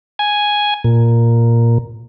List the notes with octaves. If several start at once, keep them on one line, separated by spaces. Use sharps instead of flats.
G#5
A#2